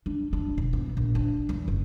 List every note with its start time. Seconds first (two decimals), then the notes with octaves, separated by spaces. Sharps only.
0.06 D4
0.33 D4
0.58 E1
0.73 B3
0.97 A#1
1.15 D4
1.49 E2
1.68 F#1